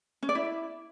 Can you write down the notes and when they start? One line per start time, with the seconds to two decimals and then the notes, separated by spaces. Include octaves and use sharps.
0.23 C#4
0.29 D5
0.35 E4